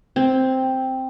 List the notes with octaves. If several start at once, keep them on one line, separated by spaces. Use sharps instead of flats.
C4